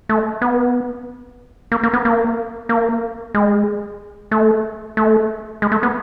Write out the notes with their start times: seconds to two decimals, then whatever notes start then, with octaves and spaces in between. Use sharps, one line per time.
0.09 A3
0.42 B3
1.72 A#3
1.83 A#3
1.93 B3
2.05 A#3
2.69 A#3
3.34 G#3
4.31 A3
4.97 A3
5.62 G#3
5.72 A3
5.83 B3